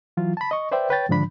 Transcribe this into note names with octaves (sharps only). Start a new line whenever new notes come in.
E3 F#3 F4
A5 B5
D#5 C#6
B4 C5 D5 E5 G5
B4 C#5 G5 A6
G#2 D3 D#3 F3 D4 B5